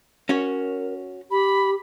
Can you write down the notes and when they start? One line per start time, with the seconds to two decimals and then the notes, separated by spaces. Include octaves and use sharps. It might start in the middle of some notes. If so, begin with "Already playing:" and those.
0.29 C#4 F#4 A#4 C#5
1.31 G4 B5